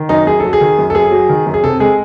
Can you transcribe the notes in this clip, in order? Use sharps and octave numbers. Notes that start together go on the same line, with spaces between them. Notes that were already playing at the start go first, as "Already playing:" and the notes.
Already playing: D#3
F#2 D#4
F#2 G#4
F#3 A4
G#4
D#3
F#2
A4
F#2 G#4
F#3
D#3
F#2
G#4
C3 A4
G#3 G#4